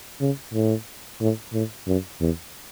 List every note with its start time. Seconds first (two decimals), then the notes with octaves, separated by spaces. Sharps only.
0.20 C#3
0.54 A2
1.20 A2
1.53 A2
1.87 F#2
2.20 E2